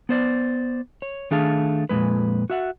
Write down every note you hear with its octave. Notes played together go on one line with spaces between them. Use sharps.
B3 C5 D5
C#5
D#3 A3 D4 G#4 F5 A5
F2 A#2 C#3 G#3 B4
F#4 E5 F#5